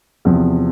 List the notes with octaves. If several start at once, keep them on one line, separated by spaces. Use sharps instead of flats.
E2 C3 F3